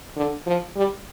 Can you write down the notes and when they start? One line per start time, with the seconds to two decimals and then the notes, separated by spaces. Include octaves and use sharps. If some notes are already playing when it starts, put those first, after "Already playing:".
0.16 D3
0.46 F3
0.76 G3